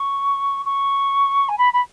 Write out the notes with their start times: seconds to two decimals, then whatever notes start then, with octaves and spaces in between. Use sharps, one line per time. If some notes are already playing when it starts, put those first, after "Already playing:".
Already playing: C#6
0.65 C#6
1.48 G#5
1.58 B5
1.73 B5